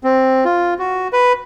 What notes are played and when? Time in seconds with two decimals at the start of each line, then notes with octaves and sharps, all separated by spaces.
0.04 C4
0.45 F4
0.79 F#4
1.13 B4